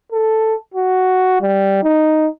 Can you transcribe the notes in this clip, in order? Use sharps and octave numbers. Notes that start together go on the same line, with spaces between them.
A4
F#4
G3
D#4